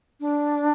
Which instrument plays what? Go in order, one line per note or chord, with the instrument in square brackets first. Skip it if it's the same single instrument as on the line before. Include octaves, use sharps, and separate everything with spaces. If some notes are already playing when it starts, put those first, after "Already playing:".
[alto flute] D4